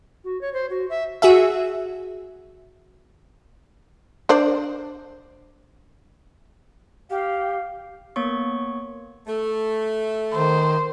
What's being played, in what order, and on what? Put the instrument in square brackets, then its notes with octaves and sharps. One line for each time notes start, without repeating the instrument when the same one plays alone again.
[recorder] F#4
C#5
C5
F#4
E5
[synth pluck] F#4 G#4 E5
[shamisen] D4 C5 D5
[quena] G4 [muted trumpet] F5
[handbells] A#3 B3 C#5 C#6
[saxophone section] A3
[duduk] D#3 [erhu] C5